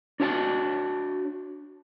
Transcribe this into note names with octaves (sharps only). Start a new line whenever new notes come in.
D4 F#4 C#5 F#5 A5